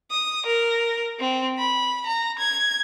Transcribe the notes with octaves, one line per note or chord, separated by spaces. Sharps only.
D#6
A#4
C4
B5
A#5
G#6